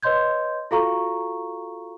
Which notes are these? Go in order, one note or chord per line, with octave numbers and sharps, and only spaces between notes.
B4 C#5 D#5 C6 G6 G#6
F4 F#4 A4 F5 A#5 C#6